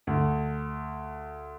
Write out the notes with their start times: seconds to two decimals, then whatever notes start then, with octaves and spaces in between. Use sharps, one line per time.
0.07 D2